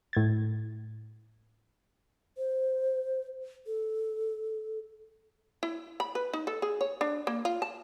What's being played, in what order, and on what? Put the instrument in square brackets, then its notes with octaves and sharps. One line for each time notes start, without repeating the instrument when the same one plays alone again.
[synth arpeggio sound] A2 G#6 A6
[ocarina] C5
A4
[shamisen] E4
B5
B4
D#4
A4
G#4
C#5
D4
A#3
F4
A5